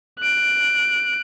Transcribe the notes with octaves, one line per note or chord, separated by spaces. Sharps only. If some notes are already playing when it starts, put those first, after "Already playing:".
F#6 D7